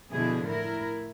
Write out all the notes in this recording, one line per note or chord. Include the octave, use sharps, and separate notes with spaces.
B2 D3 F3 E4 G#4
A2 E4 A#4